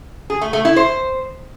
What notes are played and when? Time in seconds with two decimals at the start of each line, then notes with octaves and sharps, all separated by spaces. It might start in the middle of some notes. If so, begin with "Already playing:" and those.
0.30 G#4
0.41 A3
0.53 A3
0.65 E4
0.76 C5